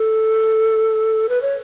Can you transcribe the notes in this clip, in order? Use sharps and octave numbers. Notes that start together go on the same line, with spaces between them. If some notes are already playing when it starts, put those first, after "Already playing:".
Already playing: A4
B4
C#5